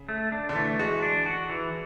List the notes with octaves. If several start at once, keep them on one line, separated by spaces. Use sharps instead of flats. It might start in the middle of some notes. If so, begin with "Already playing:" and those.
Already playing: C#3
A3
D4
D3
E3 A3
G#3 F#4
D4
F#4
E3